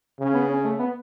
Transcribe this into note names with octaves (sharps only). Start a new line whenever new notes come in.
C#3 C#4
B3
C#4
A3
B3